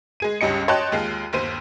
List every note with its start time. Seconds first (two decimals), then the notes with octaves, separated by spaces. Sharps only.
0.20 G#3 G#4 D#7
0.41 C#2 G2 G3 C#4 D#5 C#7
0.68 C#5 D#5 G5 A5 C6 F#6
0.92 D#2 G#3 F4
1.33 G1 D#2 C5 D#7